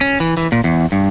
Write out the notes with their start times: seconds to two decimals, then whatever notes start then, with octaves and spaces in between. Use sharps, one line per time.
0.01 C#4
0.20 E3
0.37 E3
0.52 A#2
0.64 E2
0.92 G2